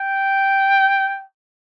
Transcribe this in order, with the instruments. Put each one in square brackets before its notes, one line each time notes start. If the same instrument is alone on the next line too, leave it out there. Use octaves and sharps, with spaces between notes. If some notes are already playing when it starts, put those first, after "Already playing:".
Already playing: [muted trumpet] G5